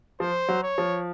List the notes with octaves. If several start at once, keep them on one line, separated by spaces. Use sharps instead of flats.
F3 C5
F#3
C#5
F3